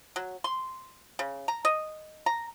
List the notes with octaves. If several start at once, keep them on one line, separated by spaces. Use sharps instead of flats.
F#3
C6
C#3
A#5
D#5
A#5